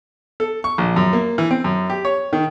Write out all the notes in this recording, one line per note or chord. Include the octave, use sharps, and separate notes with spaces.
A4
C#6
A#1
F#2
A#3
E3
C4
F#2
G4
C#5
D#3